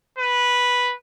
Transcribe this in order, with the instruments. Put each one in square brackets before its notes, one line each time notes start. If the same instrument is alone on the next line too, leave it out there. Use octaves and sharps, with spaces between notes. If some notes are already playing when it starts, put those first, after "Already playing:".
[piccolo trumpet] B4